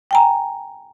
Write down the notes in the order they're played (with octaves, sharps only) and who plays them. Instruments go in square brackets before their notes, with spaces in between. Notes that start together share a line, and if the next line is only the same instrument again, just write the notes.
[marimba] G5 G#5 A#5